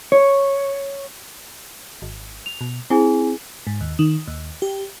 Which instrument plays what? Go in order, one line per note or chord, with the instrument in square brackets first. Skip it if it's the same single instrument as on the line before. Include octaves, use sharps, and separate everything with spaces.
[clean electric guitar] C#5
[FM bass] G#1
[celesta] F7
[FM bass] B2
[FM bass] C4 [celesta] E4 G#4 G#5
[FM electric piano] G#2
D#2
D#3
D#2
G4